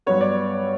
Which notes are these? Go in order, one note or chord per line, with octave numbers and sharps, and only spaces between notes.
G2 F#3 B3 C#5
D5